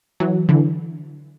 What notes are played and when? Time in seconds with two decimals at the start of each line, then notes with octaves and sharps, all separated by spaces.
0.20 E3 F#3
0.49 D3 E3